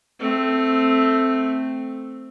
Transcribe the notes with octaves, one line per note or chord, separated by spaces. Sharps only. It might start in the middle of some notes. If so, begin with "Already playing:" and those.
A3 C4